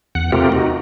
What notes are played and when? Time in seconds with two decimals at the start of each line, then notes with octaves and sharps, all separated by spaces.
0.15 E2 F#5
0.32 C3 A3 C4 F4 G4 A#4
0.52 D#4 F#4